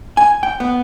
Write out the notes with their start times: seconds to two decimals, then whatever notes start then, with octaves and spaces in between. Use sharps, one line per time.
0.17 G#5
0.43 G5
0.60 B3